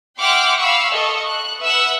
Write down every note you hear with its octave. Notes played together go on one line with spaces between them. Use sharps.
E5 F#5 G5 C6 D6 F6
F5 B5 C#6 E6
A4 D#5 C#6
F#6
B4 E5 F#5 E6 F#6